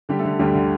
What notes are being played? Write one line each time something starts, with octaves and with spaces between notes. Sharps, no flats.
D3 G3 G4
A3 A4
D3
D2 G3 G4
D3